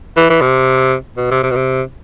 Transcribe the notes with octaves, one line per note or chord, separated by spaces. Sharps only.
E3
E3
C3
B2
C3
C3
B2
C3